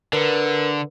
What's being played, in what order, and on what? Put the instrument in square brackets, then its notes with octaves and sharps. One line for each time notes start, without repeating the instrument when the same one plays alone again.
[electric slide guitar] D3 [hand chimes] A#4 B4